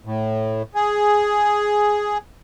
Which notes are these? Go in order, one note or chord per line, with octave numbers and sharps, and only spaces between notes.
A2
G#4